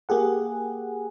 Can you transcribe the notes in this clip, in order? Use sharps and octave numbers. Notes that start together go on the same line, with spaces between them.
A#3 G4 G#4 F#5